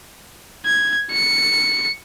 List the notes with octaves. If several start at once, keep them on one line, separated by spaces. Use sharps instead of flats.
G#6
C#7